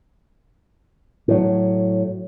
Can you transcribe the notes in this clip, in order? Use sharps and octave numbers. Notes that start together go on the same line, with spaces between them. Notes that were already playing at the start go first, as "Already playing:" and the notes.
A2 F#3